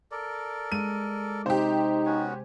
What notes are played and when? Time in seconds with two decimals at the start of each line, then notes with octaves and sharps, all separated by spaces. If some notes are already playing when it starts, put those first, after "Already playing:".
0.12 A4 A#4 D5
0.72 G#3 D#7
1.46 C3 D#4 G4 C5
2.06 B3 C#4 F#4 G#5